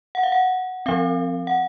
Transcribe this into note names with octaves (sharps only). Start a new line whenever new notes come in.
F#5
F5
F#5
F3 C4 F5
F#5